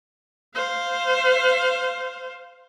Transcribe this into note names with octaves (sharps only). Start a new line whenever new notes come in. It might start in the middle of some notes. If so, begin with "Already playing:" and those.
C5 F5